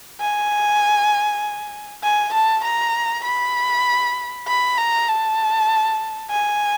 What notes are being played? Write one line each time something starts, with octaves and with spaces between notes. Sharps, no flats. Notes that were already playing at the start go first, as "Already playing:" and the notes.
G#5
G#5
A5
A#5
B5
B5
A#5
A5
G#5